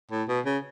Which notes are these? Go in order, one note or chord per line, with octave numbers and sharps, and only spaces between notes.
A2
B2
C#3